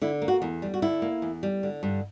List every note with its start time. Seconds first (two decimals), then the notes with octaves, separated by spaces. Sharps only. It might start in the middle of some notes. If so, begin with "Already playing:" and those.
0.02 D3 E4
0.22 A#3
0.28 F#4
0.42 E2
0.62 G3
0.74 F#4
0.82 D3 E4
1.02 A#3
1.22 E2
1.43 G3
1.63 D3
1.83 G2